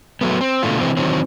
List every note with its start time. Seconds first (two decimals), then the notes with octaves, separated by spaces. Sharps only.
0.21 F#3 A3 B3
0.41 C4
0.63 B2 D3 A3 F4
0.81 C3 E3 G#3 C4
0.97 D#3 E3 F#3 C4